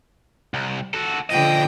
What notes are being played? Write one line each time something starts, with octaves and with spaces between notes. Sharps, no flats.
C2
F#4 A4
A#2 D3 F3 D#5 G5